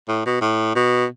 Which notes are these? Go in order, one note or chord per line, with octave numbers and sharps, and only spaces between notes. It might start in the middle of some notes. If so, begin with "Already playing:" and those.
A2
B2
A2
B2